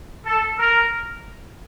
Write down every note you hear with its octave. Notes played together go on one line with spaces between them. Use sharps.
A4
A#4